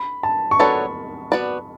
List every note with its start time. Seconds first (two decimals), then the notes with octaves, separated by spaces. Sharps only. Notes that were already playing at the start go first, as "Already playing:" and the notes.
Already playing: B5
0.23 A5
0.51 C#6
0.59 F#3 B3 D4 A4 C#5 B5
1.32 B3 F#4 B4 D5